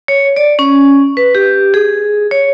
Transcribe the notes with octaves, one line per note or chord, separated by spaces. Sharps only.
C#5
D5
C#4
B4
G4
G#4
C#5